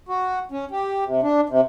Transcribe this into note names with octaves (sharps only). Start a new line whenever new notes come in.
F#4
C#4
G4
C3
D4
C3